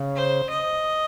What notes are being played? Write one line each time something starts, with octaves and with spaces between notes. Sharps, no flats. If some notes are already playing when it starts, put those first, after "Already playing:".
Already playing: C#3
C5
D#5